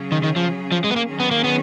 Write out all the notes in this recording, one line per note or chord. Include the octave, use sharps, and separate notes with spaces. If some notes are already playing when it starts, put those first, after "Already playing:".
Already playing: C#3 F#3 C#4 G#4
D#3
D#3
F3
F3
G#3
B3
A#3
D#3 F#3 C#4 G#4
B3
A#3
B3